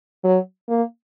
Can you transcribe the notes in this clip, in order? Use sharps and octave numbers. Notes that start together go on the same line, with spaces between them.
F#3
A#3